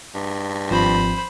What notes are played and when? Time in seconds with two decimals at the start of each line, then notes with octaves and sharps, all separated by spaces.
0.15 G2
0.70 G#1 F3 C4 C5 B5